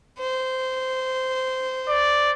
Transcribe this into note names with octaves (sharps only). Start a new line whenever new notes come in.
C5
D5